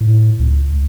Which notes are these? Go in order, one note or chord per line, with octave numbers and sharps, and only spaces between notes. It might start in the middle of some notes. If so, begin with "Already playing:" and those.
A2
C#2